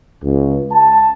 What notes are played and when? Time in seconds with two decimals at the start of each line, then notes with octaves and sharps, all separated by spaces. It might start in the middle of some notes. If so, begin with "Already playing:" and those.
0.23 C#2
0.72 A5